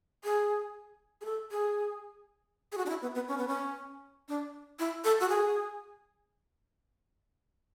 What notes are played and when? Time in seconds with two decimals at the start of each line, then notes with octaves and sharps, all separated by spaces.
0.24 G#4
1.21 G#4
1.25 A4
1.51 G#4
2.72 G#4
2.77 F#4
2.86 D4
2.89 E4
3.02 B3
3.15 B3
3.28 C#4
3.38 B3
3.48 C#4
4.28 D4
4.79 E4
5.04 A4
5.20 F#4
5.29 G#4